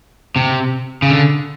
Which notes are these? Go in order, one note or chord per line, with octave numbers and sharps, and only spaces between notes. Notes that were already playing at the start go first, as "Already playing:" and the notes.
C3
C#3
D3